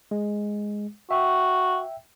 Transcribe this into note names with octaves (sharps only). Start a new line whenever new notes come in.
G#3
F#4 E5 G5